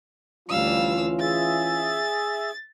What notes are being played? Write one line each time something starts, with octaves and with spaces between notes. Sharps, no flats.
D2 E3 G3 C#4 F4 F5 E6
G#4 E5 A6